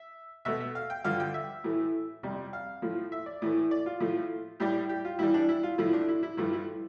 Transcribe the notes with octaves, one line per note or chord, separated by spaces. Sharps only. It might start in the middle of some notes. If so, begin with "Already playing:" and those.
Already playing: E5
B2 A3 E5
E5
F5
G5
G2 D3 F3 F5
G5
E5
A2 E3 A3
F2 C3 G3
F5
A2 F3 A3
E5
D5
A2 E3 A3
D5
F4
A2 F3 A3
A2 G3 G4
G4
F4
A2 E3 G3 E4
D4
E4
F4
A2 F3 A3 E4
D4
E4
E4
G2 F3 A3 E4
E4